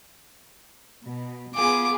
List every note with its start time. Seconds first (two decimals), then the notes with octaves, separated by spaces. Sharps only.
1.03 B2
1.55 B3 F4 G#4 D6